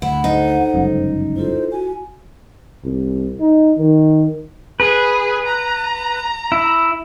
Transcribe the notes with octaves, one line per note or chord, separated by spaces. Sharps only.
D2 E4 F#5
D#4 A4 C5
G1 C#2 F#2
E4 F4 A4 C5
F#4 G#5
C2
D#4
D#3
G#4 B4
A#5
E4